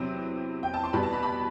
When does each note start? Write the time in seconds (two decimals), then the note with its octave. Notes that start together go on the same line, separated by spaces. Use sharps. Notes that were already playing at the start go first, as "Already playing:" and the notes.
Already playing: E2 C3 F#3 C4
0.63 G5
0.74 A5
0.84 C6
0.93 E2 B2 G3 B3 B5
1.03 A5
1.13 B5
1.23 B5